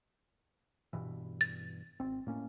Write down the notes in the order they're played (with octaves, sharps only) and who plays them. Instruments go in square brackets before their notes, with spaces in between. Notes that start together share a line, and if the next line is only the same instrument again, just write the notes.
[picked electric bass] G2 B2 E3
[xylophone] A6
[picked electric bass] G#1 C4
A2 A#3 C#4